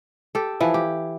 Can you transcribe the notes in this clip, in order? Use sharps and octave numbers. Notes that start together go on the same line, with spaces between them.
G4 A4
E3 F3 E4
G4